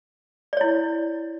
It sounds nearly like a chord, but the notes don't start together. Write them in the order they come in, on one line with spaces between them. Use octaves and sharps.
D5 C#5 E4